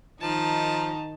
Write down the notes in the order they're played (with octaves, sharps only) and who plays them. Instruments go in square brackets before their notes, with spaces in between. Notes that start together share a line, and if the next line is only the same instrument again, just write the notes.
[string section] D#3 D#4 [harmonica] F3 A#5 [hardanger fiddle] A5